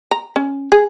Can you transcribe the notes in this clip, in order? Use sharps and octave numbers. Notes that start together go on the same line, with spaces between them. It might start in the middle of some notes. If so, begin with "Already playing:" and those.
A#5
C#4
G#4